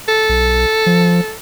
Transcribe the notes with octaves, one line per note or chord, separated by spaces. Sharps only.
A4
B1
F3